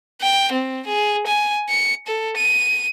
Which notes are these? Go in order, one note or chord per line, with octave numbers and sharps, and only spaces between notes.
G5
C4
G#4
G#5
C#7
A4
D#7